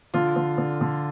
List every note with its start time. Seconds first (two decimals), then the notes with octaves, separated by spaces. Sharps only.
0.14 D3 F4
0.36 D3
0.58 D3
0.81 D3